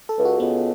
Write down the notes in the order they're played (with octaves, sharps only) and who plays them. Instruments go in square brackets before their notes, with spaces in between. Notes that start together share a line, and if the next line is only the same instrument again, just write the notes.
[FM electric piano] A4
[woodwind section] C#2
[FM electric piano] F#4
[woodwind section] C#2 [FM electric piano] B3